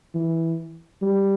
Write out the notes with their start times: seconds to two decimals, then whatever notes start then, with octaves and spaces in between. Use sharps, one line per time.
0.14 E3
1.02 G3